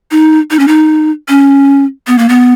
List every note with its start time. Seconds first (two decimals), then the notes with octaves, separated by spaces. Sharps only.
0.11 D#4
0.51 D#4
0.59 C#4
0.68 D#4
1.29 C#4
2.07 B3
2.18 A#3
2.29 B3